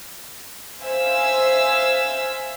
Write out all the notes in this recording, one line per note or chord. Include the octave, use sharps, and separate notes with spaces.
C5 E5 F5 G#5 E6